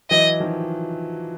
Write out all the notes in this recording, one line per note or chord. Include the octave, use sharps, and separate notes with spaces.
E3 F#3 D#5
D#3 F3